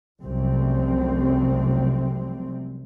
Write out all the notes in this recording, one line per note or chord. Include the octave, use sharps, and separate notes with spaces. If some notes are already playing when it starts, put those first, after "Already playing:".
F1 C2 F#2 C3 C4